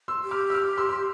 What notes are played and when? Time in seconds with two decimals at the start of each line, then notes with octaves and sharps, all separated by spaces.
0.08 C6 E6
0.24 G4
0.31 D6 F6
0.50 E6
0.54 D6 F6
0.77 C6 E6
0.89 C6